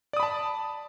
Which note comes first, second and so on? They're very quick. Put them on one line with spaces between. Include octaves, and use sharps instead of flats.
D5 D#6 B5 A5